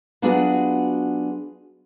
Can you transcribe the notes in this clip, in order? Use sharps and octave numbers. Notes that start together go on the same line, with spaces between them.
F#3 B3 D4 F4 F#4 G#4